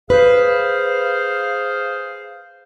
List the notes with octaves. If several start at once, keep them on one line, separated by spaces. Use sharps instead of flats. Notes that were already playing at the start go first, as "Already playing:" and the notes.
G#4 B4 C5 F5